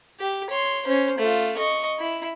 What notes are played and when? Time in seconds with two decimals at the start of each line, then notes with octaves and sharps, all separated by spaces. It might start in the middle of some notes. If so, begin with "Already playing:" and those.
0.20 G4
0.50 C#5 C6
0.86 C#4 C5
1.18 A3 F4
1.57 D#5 C#6
1.99 E4